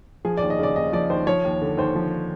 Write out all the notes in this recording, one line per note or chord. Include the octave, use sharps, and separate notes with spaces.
F3 G#4
D5
D#2
D#5
C#3 D5
D#2 D#5
F3 D5
D#2 C5
F3 C#5
D#2
D3
D#2 C5
F3